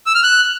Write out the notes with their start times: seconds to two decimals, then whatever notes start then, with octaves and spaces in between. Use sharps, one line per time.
0.06 E6
0.15 F6
0.23 F#6